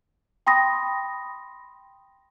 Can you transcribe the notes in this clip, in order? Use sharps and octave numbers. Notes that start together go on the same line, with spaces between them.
G5 B5 C6 D#6 A#6